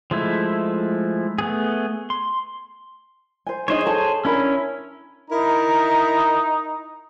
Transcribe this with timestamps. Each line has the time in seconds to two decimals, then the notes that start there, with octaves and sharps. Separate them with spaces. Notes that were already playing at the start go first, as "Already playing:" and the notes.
0.11 F3 G#3 A3 E4
1.39 A3 B3 G#4
2.10 C6
3.47 C5 G#5
3.68 D4 D#4 G#4 C5 C#5 D#5
3.86 A4 A5
4.25 C#4 D4 E4 A#4 B5
5.30 D#4 E4 A#4 A#5